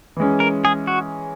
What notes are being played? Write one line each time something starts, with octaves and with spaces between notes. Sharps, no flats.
E3 G#3 C#4
A#4
G#4
F#4